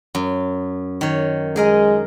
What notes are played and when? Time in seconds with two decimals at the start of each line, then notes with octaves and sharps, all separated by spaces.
0.15 F#2
1.01 D#3 C#5
1.56 G#3 G#4 A#4 D#5